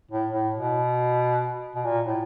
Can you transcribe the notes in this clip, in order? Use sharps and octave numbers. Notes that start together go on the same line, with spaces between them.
A2
A2
B2
B2
A#2
A2